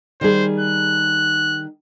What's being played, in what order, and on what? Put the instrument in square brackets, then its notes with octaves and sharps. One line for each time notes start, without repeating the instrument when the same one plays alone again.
[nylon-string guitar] D#3 G3 G#4 [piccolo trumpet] C5
[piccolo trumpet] F#6